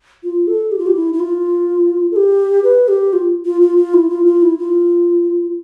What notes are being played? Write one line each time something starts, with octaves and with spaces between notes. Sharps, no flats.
F4
A4
G4
F4
G4
E4
E4
F4
A4
G4
B4
G4
F4
F4
F4
F4
E4
F4
F4
E4
F4